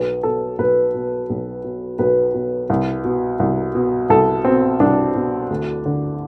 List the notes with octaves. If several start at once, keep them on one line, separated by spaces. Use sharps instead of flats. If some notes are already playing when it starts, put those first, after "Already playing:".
Already playing: B1 B4
B2 A4
B1 B4
B2
B1
B2
B1 B4
B2
C2
B2
C2
B2
C2 A4
B2 C4
C2 D4
B2
D2
D3